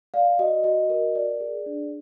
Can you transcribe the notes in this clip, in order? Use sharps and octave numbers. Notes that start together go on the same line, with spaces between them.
D5 F5
F#4 D#5
F#4 D#5
A#4
D5
G#4
D4